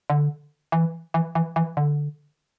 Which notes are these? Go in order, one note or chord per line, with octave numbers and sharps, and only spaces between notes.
D3
E3
E3
E3
E3
D3